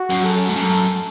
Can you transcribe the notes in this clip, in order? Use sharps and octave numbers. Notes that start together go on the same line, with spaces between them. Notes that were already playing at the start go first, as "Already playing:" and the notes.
Already playing: F#4
F#2
A4
G#2
F#2